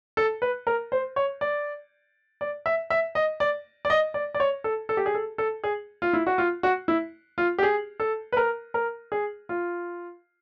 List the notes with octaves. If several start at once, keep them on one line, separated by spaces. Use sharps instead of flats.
A4
B4
A#4
C5
C#5
D5
D5
E5
E5
D#5
D5
D5
D#5
D5
D5
C#5
A4
A4
G4
G#4
A4
A4
G#4
F4
E4
F#4
F4
F#4
E4
F4
G4
G#4
A4
B4
A#4
A#4
G#4
F4